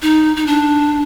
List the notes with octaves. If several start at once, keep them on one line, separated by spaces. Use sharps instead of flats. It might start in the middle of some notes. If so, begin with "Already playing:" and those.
D#4
D#4
D4